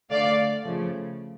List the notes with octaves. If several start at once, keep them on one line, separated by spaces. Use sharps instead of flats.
D3 A3 D5 F5
C#3 F3 A3